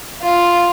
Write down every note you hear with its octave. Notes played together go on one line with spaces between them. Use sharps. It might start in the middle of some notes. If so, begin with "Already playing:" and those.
F4